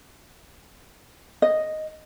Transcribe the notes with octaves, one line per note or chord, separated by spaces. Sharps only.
D#5